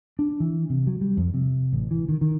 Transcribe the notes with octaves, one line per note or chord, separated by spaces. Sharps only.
D4
E3
C3
F#3
G3
F2
C3
A1
E3
D#3
D#3